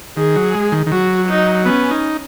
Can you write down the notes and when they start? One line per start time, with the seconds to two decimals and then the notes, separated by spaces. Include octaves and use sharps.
0.17 D#3 G#4
0.36 F#3
0.54 G#3
0.72 D#3
0.86 D#3
0.92 F#3 F#4
1.29 D#4
1.65 B3 C#4
1.91 D#4